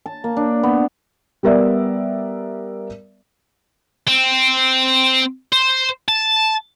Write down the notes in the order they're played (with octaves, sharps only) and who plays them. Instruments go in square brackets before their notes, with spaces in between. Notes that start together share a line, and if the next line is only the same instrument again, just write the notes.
[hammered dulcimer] A5
A#3
D4
B3
[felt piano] G3 B3 A#4 D5 E5
[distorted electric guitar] C4
C5
A5